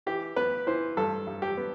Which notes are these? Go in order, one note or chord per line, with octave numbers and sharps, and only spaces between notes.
E3 G4
B3 B4
E3 C5
G2 A4
G2
G4
B3